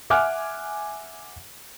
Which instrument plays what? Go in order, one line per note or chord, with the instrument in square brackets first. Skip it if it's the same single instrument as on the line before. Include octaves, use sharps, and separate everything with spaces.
[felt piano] E5 F#5 G#5 D6 F6 F#6